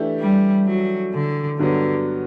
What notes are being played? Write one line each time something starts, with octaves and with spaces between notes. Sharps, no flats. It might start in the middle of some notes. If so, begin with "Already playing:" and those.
Already playing: E3 A3 D4 G4
G3
F#3
D3
G2 D3 F#3 B3